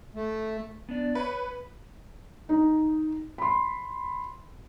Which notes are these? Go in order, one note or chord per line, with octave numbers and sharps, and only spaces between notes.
A3
B3 D4 D5
B4 C#5
D#4
B5 C6